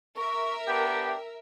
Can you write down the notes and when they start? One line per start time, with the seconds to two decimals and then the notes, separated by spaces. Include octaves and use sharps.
0.17 A#4 E5 C#6
0.67 B3 D4 G4 G5